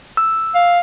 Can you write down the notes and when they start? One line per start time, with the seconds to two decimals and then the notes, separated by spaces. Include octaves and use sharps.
0.17 E6
0.55 F5